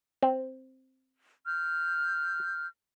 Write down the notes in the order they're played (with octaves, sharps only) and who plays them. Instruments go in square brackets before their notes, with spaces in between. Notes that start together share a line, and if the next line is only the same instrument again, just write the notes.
[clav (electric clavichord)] C4
[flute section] F6 G6